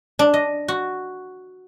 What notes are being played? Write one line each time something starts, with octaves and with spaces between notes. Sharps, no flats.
D4
D#5
F#4